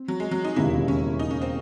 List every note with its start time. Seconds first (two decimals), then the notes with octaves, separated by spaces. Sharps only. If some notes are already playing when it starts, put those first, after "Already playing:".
Already playing: C4
0.08 F#3
0.20 G#3
0.31 F#3
0.44 D#4
0.56 E1 D#2 C#3 E4
0.88 C#4
1.19 D#4
1.31 C#4
1.42 C4